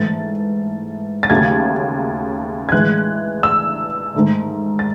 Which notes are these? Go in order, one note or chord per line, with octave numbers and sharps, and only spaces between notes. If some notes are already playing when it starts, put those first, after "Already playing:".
Already playing: G#2 E3 A3 A6
A6
D#2 C#3 F#3 A3 G#6
G#6
A2 E3 G#3 F#6
E6
G#2 D#3 A3
A6